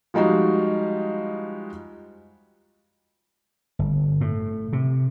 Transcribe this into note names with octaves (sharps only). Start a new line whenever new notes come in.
F3 G3 G#3 D#4 F#4
G1
A2
C3